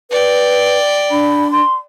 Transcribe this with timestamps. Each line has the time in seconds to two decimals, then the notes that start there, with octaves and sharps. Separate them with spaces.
0.11 B4 D5 G5
1.11 D4 B5
1.52 C6